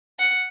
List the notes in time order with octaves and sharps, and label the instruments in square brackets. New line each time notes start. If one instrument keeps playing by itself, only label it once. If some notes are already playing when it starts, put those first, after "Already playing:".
[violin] F#5